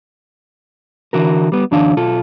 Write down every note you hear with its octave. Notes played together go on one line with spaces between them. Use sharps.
D3 E3 F#4 A#4
G3 B3
F#2 D3 E3 D4 F5
B1 F4 A4